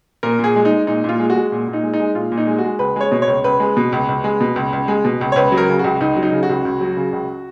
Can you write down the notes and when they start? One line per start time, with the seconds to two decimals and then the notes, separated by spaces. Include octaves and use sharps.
0.23 A#2 A#4
0.39 A#2 G#4
0.56 G#3
0.65 D#4
0.71 G#3
0.87 A#2 D#4
1.04 A#2 F4
1.20 G#3
1.30 F#4
1.36 G#3
1.52 A#2
1.68 A#2
1.73 D#4
1.83 G#3
1.94 D#4
2.00 G#3
2.15 A#2 F4
2.32 A#2
2.38 D#4
2.47 G#3
2.59 F#4
2.64 G#3
2.79 C#2 B4
2.96 G#3 C#5
3.11 B2
3.22 C#5
3.27 C#2
3.44 C#2 B4
3.60 G#3
3.77 B2
3.92 C#2
4.09 C#2
4.24 G#3
4.40 B2
4.56 C#2
4.73 C#2
4.88 G#3
5.05 B2
5.21 C#2
5.32 C#5
5.36 C#2 B4
5.52 F#3
5.58 A#4
5.69 C#3
5.79 C#2 F#4
6.00 C#2 D#4
6.16 F#3
6.23 D#4
6.32 C#3
6.43 F#4
6.49 C#2
6.65 C#2
6.81 F#3
6.97 C#3
7.13 C#2